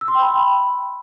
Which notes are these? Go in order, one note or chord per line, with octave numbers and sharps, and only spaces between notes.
E6
C6
G5
B5